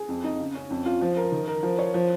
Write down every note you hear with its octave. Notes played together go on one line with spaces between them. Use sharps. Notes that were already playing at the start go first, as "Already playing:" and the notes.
Already playing: G#4
F2
D#4
C#3
C#4
F2
F4
F3
A#4
D#3
A#4
F3
C#5
F3